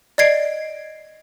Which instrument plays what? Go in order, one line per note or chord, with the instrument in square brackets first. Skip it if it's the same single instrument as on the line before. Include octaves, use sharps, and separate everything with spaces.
[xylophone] D5 D#5 G#6 C7 D7